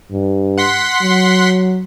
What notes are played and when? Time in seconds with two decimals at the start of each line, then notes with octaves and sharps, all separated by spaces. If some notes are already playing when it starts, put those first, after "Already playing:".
0.11 G2
0.58 F#5 C6 B6
1.01 F#3